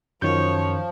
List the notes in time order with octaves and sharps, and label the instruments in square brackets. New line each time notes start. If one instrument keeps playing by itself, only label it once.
[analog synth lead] F#2 [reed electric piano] D#3 G6 [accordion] F3 [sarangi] C#5